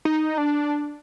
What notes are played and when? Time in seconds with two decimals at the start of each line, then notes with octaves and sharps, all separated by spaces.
0.05 D#4
0.38 D4